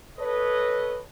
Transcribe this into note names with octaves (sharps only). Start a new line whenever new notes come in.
A4 B4 C#5 D#5